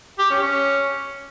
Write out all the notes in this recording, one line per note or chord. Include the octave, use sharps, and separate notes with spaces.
G4
C#4
C#4